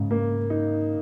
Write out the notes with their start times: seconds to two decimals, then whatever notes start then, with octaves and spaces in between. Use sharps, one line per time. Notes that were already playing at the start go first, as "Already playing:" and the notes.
Already playing: G#2 C#3
0.11 A#3
0.50 D#4